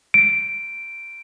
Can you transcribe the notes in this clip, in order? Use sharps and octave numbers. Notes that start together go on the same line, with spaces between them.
D7